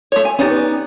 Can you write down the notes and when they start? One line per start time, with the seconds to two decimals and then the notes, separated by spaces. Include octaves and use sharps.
0.12 A3 F4 C#5
0.25 G#5
0.39 B3 C#4 D#4 G4 D5
0.51 B4